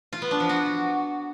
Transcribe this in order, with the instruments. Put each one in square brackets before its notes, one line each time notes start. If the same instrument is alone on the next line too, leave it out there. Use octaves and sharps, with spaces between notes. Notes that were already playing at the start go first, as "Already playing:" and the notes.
[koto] F4
B3
D4
F3
F#4